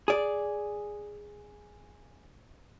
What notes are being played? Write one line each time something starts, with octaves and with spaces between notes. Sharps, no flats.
G#4 D5